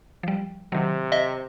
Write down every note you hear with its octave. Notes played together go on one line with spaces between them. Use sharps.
F3 G3
C3 D#3 F#3
D#5 E5